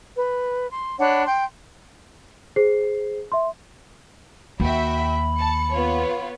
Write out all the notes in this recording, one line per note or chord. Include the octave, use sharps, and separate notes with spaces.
B4
C6
D4 C#5 F#5 B5
G5 C6
G#4 C5 C7
E5 C6
D#2 F#4 E5 G5 B5
A5 C#7
B3 F4 C#5